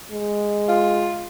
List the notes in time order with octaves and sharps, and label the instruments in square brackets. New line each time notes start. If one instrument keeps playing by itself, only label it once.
[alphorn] G#3
[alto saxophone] F4